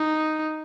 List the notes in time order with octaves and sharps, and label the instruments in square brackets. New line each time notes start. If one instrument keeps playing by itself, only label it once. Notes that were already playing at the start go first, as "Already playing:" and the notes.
Already playing: [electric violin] D#4